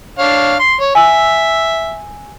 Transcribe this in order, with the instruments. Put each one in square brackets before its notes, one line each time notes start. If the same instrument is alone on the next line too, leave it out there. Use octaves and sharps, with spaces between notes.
[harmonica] D4 C#5 F5
C6
C#5
[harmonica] E5 [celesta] G#5 E6